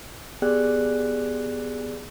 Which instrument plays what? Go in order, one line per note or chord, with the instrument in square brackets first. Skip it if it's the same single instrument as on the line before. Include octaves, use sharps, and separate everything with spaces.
[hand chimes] B3 G4 G#4 D5 G5 F#6